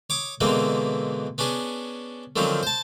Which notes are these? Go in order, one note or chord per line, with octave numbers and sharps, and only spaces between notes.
C#5 D6 D#6
B2 D3 E3 G#3 A#3 C4
B3 C#4 D4 G#4
D3 D#3 F3 F#3 C4 C#4
C5 A5